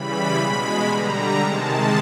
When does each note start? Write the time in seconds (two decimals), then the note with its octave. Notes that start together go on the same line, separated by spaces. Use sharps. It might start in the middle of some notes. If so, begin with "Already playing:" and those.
Already playing: C#3 E3 G3 B5
0.36 B2 G#3 B5
0.88 D3 G3 A#5
1.39 C3 D#3 G#3 A5